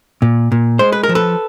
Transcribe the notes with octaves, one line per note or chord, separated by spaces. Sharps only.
A#2
A#2
G#3 C5
B4
A#4
F3
A4 B4